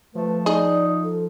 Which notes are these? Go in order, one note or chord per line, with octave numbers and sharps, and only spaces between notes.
F3 A3 B4
D#4 G#4 D5 D#5
A4